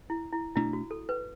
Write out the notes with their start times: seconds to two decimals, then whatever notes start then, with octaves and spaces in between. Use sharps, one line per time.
0.10 E4
0.32 E4
0.56 B1 B2 A3 D4 E4
0.73 F#4
0.91 A4
1.09 B4